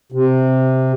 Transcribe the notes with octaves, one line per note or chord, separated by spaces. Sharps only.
C3